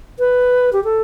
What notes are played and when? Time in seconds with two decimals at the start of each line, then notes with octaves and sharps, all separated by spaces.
0.19 B4
0.73 G4
0.84 A4